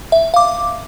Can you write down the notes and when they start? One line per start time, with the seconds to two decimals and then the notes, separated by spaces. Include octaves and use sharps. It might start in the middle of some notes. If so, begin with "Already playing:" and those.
0.12 E5
0.34 F5 D6